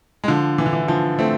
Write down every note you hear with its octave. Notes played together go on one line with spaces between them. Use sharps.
G#3
D3 F3
E3
D3
E3
D3 F3
A3 C4